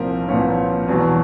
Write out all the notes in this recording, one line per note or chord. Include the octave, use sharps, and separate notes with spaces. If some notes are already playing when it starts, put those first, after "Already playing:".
Already playing: C2 A#2 F3 A#4 C5
C2 A#2 F3 B4 C#5
E2 B2 F#3